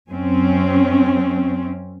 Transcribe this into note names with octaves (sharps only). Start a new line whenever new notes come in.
F#2 C4 C#4